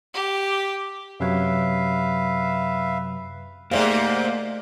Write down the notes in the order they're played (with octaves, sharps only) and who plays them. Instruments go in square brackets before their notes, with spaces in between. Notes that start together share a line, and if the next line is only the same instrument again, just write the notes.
[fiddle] G4
[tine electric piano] F#2 C3 F#3 [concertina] B4 E5 F5
[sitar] G#2 C3 [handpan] A3 D5 F5 [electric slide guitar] A#3